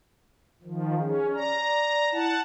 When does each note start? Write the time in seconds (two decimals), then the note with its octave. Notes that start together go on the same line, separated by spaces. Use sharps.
0.63 D#3 F3
0.99 C#4 G#4
1.34 D5 A#5
2.12 E4 F#5 A5